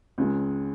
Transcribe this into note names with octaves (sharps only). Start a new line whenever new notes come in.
C#2 C#3 G#3